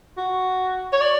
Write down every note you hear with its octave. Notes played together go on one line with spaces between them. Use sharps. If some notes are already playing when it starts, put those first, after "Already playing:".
F#4
C#5
D5